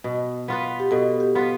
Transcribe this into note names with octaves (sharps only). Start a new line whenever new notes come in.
B2
B3 F4 B4
G4
B2 A4
G4
B3 F4 B4